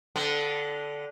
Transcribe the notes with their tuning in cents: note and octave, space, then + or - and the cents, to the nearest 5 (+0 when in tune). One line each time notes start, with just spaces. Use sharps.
D3 -15 B3 +45